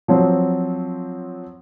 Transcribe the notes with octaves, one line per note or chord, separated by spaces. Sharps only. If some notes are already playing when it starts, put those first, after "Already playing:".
F3 F#3 C4